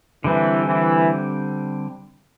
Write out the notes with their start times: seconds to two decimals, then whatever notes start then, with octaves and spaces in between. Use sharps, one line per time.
0.24 D3 E3 G3 C4
0.66 E3